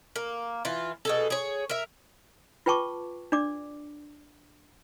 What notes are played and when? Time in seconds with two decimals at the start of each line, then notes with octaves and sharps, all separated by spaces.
0.16 A#3
0.65 E3 F4
1.05 B2 G#4 A4
1.30 G#4 C#5
1.70 A#4 E5
2.66 F4 B4 G5 A5 C#6 D6
3.32 D4 D5 D6